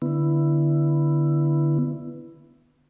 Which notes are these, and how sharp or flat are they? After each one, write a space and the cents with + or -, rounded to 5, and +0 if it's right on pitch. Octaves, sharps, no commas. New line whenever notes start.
D3 +0 B3 +0 E4 +10